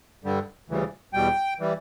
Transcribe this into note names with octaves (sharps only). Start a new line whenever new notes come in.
G2 D3 G3
D2 C#3 E3 G3
E2 B2 G3 G5
E3 G3